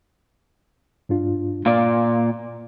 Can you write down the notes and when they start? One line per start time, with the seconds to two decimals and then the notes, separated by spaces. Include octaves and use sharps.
1.09 G2 D4 F4
1.66 A#2 D5 F5